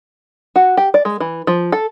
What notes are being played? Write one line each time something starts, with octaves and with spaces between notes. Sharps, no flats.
F#4
G4
D5
G#3
E3
F3
A4